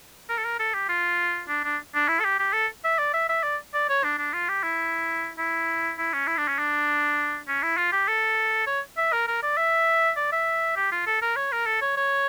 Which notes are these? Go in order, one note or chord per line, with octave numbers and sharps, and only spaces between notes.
A#4
A4
A#4
A4
G4
F4
D4
D4
D4
E4
A4
G4
G4
A4
E5
D5
E5
E5
D5
D5
C#5
D4
D4
F4
G4
E4
E4
E4
C#4
E4
D4
C#4
D4
C#4
E4
F4
G4
A4
C#5
E5
A#4
A#4
D5
E5
D5
E5
G4
F4
A4
A#4
C#5
A#4
A4
C#5
C#5